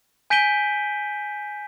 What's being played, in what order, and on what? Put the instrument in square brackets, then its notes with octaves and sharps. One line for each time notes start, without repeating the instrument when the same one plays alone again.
[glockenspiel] G#5 G6 B6 D7 D#7 G7